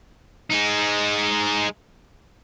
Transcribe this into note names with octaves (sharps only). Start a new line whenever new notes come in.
G#3 D#4